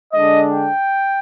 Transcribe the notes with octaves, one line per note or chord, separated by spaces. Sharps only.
D3 G#3 D4 D#5
G5